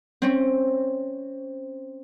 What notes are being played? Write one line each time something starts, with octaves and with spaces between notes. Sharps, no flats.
C4 C#4